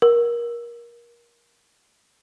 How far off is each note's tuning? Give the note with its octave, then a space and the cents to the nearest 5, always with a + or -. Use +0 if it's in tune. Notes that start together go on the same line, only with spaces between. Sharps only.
A#4 +25